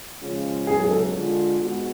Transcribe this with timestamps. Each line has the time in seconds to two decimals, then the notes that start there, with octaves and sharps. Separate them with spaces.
0.21 C#3 F3 G#3 C#4 F4
0.67 C#2 B2 F#3 G#4
0.80 G#4
0.91 A4
1.14 D3 G#3 D4 F4
1.60 G#2 G#3 B3 F#4